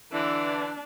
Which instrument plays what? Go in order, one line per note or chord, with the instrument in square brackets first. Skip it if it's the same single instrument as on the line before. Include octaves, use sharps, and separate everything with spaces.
[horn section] D3 E3 [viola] D4